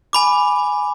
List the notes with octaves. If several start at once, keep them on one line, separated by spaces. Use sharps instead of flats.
G#5 B5 D6